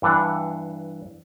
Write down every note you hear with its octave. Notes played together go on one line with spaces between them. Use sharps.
G2 E3 D4 F#5